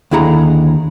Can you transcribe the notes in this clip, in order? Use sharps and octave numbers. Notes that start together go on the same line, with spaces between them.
D#2 D3 E4 G#4 A#5